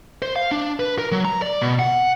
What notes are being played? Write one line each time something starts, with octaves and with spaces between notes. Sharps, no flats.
C5
F5
D4
B4
A#4
F#3
A#5
D5
B2
F#5